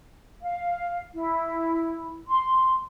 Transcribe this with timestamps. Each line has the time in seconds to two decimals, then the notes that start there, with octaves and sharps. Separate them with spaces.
0.43 F5
1.14 E4
2.30 C6